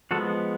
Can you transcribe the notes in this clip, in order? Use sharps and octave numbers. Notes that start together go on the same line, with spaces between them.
F3 G#3 B3 F#4 A4